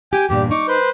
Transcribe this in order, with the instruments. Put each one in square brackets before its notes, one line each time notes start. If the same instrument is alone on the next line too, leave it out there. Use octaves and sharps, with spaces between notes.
[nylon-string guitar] G4 [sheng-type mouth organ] G5 G#5
[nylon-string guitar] E2 G2 A#2 [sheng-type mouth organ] G4
[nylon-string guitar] D#4 [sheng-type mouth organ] C#6 D6
[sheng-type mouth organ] B4 C5 G6